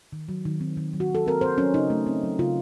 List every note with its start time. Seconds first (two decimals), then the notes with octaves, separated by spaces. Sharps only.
0.12 D#3
0.28 F#3
0.45 D#3
0.61 C4
0.77 D#3
0.93 F#3
1.00 F#4
1.10 D#3
1.15 A4
1.26 C4 A#4
1.41 C4 C5
1.58 F#3 C#4
1.74 C#3 D#4
1.90 A3
2.06 C4
2.23 F#3
2.39 C#3 F4